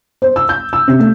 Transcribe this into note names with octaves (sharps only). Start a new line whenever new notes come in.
C5
E6
G6
E6
C3
A3